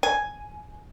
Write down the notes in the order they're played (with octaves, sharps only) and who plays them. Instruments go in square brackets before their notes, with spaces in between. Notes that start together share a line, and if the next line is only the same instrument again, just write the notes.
[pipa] G#5